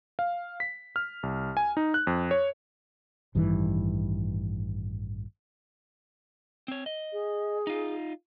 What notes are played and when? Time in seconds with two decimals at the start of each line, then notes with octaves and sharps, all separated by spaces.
0.19 F5
0.60 B6
0.96 F6
1.23 C2
1.57 G#5
1.77 D#4
1.94 F#6
2.07 F2
2.31 C#5
3.35 A1 G2 D#3 E3
6.68 C4 C#5
6.86 D#5
7.13 G#4
7.67 D#4 F4